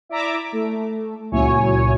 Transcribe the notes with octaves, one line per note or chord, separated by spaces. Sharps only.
E4 D5 E5 A#5 D6
A3
C#2 A#2 F#3 E4 C#5 G#5